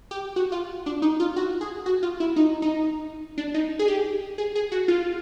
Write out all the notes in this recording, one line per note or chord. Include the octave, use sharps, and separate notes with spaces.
G4
F#4
F4
D4
D#4
F4
F#4
G#4
F#4
F4
E4
D#4
D#4
D4
D#4
G#4
G4
G#4
G#4
F#4
F4